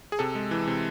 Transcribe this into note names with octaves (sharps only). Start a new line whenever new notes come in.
G#4
C3 A4
G#3
E3
C3